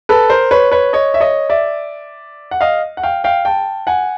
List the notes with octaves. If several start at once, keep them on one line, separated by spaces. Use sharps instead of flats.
A4 B4
A#4 C5
B4 C#5
B4 C#5
C#5 D#5
E5
C#5 D#5
D5 E5
F#5
D#5 F5
F#5
F5 G5
F5 G5
G5 A5
F#5 G#5